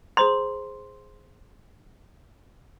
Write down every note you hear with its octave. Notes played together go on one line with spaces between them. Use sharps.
G#4 C5 A#5 C6